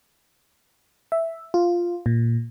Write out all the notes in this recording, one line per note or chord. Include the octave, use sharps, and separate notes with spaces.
E5
F4
A#2